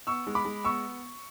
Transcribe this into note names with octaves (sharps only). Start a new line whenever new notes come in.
B3 C#6 E6
G#3
B5 D6
G#3
B3 C#6 E6